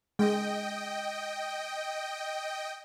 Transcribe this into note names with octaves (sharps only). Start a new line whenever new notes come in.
G#3 D#5 G5